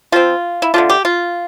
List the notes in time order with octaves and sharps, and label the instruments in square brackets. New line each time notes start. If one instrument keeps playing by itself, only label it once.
[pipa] F3 C4 F4
E4
D3 A3 D4 F4
G4
F4